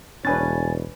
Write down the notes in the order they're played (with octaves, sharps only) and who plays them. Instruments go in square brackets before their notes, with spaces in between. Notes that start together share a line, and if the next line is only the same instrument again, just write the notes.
[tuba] E1 [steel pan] C#4 D4 B4 [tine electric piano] G#5 A6